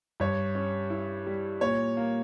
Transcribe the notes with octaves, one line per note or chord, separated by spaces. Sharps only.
G2 C#5
C#4
E4
G3
A#2 C#5
A#3